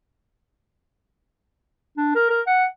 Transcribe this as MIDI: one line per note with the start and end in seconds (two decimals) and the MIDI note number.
1.97 2.13 62
2.15 2.29 70
2.30 2.41 70
2.47 2.65 78